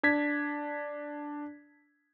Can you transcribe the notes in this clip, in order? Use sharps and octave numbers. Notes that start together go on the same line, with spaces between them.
D4 G#6 B6